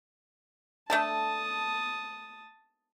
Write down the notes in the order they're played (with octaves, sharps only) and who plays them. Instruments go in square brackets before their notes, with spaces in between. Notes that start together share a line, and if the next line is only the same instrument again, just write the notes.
[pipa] A3 D4 A4 [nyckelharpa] A5 D#6